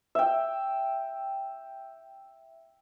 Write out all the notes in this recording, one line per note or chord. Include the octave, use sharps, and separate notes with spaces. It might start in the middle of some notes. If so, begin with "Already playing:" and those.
E5 G5